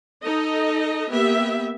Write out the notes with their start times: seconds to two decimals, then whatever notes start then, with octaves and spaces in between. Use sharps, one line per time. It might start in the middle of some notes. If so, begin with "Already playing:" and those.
0.22 D#4 A4 D#5
1.09 A#3 B3 G4 E5